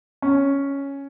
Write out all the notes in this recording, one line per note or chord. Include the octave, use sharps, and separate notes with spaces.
C#4